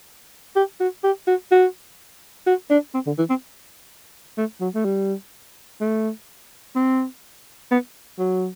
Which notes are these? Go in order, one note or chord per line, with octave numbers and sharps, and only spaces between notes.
G4
F#4
G4
F#4
F#4
F#4
D4
C4
D3
E3
C4
A3
F#3
A3
G3
A3
C4
B3
F#3